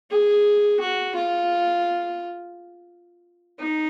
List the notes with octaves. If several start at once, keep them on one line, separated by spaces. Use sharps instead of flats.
G#4
F#4
F4
D#4